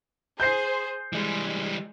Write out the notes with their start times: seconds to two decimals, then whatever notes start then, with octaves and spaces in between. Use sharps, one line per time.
0.40 G#4 C5 G6 C7
1.13 E3 G3 G#3